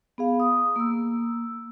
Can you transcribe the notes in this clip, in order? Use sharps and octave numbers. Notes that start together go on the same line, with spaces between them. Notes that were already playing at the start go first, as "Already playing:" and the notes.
B3 G#4 F5
D#6
A#3 E6